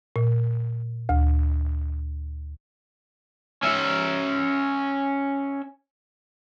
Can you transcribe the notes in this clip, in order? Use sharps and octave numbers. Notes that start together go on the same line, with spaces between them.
A#2
D2
C#4 E5